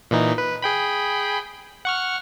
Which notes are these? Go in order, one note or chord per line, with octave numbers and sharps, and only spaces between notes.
A#2 E3 D#4
B4
G#4 G5 B5
F#5 C#6 F6